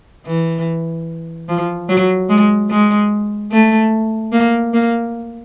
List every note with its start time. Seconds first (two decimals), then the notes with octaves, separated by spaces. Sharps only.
0.26 E3
1.49 F3
1.89 F#3
2.29 G#3
2.71 G#3
3.52 A3
4.33 A#3
4.73 A#3